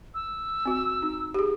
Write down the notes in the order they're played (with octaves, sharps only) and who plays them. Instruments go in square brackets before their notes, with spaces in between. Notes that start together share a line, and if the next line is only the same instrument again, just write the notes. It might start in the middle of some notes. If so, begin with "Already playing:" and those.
[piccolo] E6
[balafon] C4 F#4
D#4
G4 G#4